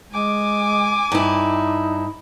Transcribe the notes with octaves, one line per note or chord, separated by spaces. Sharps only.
G#3 G#5 D6
G2 D#4 E4